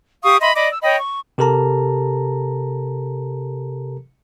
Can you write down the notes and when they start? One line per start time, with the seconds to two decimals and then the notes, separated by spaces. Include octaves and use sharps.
0.24 G4 F5 C#6 D#6
0.41 D#5 E5 B5 C6
0.55 D5 D#5 B5 D6
0.71 E6
0.83 C#5 D#5 G5 B5
0.99 C#6
1.38 C3 G4 A4 A#4 A5 A#5